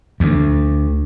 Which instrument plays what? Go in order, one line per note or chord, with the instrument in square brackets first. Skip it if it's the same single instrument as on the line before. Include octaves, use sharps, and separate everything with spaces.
[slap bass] D2